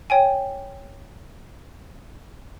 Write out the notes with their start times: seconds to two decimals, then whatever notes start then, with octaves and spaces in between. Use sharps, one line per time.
0.10 C#5 G5 G#5